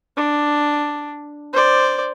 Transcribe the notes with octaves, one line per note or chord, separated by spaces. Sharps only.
D4
C5 D5